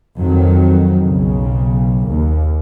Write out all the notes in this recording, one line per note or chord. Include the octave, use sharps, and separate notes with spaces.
F2 D#3 F#3
B1 C#3
D#2